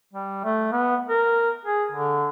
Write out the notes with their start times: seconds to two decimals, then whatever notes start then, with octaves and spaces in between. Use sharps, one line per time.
0.14 G3
0.44 A3
0.73 B3
1.09 A#4
1.66 G#4
1.92 D3